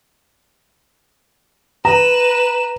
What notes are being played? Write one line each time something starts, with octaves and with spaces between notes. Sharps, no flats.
B4 A#5 E7